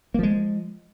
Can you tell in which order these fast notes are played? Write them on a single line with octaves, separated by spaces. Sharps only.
A#3 F3 G#3